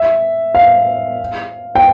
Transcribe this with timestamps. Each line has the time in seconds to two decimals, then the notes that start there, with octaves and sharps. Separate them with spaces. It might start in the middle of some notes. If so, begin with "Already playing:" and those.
Already playing: E5
0.55 F5
1.75 G5